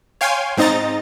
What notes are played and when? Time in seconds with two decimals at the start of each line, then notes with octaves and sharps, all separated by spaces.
0.21 C#5 F5 G5 G#5 C6
0.57 G#2 C4 D#4 D#5 A#5 A6